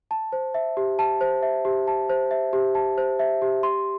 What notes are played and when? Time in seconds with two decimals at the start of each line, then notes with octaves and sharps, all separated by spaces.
0.11 A5
0.33 C5
0.54 E5
0.77 G4
0.99 A5
1.21 C5
1.43 E5
1.65 G4
1.87 A5
2.09 C5
2.31 E5
2.53 G4
2.75 A5
2.98 C5
3.19 E5
3.42 G4
3.63 C6